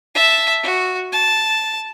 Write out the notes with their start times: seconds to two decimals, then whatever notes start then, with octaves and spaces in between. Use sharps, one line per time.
0.15 E5 A5
0.63 F#4
1.12 A5